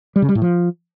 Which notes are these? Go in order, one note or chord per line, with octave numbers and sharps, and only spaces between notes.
G3
C#3
G3
A2
F3